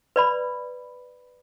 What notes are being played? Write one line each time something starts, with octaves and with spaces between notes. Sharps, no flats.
B4 D5 B5